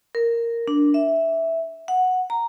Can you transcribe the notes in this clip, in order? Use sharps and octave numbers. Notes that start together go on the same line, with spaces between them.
A#4
D4
E5
F#5
A#5